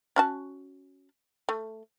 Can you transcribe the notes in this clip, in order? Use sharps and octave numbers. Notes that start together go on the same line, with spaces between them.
C#4 F#4 A5
A3